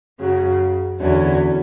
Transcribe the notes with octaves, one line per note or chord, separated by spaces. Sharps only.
F#2 C#3 F#3
E2 D3 F#3 C#4 E4